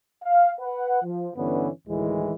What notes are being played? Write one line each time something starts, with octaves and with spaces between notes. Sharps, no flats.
F5
B4 F#5
F3
G2 D3 E3 B3 C#4
D2 A2 D#3 E3 G#3